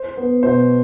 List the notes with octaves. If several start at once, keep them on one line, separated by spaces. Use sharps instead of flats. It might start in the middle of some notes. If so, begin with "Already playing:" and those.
Already playing: C5
B3
B2 C5